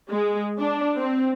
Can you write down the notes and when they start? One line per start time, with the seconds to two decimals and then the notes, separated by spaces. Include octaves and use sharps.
0.10 G#3
0.60 D4
0.97 C4